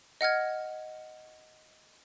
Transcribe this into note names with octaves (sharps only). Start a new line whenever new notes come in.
D#5 F#5 F6 G#6